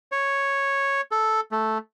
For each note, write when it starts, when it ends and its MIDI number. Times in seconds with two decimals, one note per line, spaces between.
0.12 1.01 73
1.11 1.40 69
1.52 1.78 57